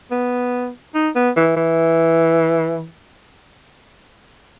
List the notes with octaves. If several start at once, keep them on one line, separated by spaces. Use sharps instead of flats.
B3
D#4
B3
E3
E3